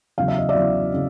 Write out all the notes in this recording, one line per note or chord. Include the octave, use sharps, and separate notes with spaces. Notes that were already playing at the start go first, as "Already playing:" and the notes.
E2 C#3 F#3 F5
E5
D#5
D5 E5
E2 C#3 F#3
C#3